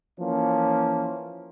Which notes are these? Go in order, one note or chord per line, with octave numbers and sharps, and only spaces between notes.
E3 F3 A#3 C#4